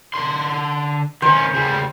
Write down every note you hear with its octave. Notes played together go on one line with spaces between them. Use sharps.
D3 C6
D#3 C#4 C5
C#3 G3